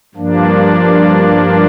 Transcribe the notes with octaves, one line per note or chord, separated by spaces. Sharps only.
G2 F3 A#3 D4